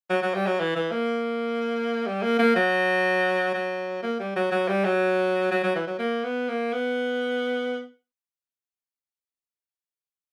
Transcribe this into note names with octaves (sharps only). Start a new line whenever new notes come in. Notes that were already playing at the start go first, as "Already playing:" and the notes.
F#3
F#3
G3
F#3
E3
E3
A#3
G3
A#3
A#3
F#3
F#3
A#3
G3
F#3
F#3
G3
F#3
F#3
F#3
E3
F#3
A#3
B3
A#3
B3